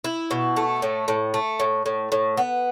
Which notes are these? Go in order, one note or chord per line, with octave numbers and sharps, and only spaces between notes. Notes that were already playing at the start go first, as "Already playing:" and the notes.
E4
B2
A3
A2
A2
A3
A2
A2
A2
B3